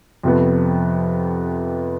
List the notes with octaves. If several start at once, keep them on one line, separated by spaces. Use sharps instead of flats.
F2 C3 F3 B3